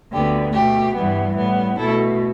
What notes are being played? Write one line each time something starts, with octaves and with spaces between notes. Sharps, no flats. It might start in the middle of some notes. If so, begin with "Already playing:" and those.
D2 D3 B3 G4
B2 A3 G4
G2 E3 G3 B3
A2 G3 B3
B2 A3 E4 A4